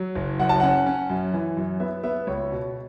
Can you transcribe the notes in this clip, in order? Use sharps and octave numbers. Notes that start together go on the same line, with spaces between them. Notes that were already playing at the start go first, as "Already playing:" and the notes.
Already playing: F#3
F#1
F#2 F#5
A5
C#4 F#5
C#4
F#2
E3
F#2
B3 E5
B3 E5
C#2 C#5
B2